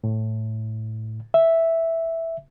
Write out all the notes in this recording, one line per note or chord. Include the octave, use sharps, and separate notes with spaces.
A2
E5